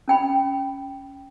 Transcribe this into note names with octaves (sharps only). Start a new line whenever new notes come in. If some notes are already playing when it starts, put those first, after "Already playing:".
C#4 G5 B5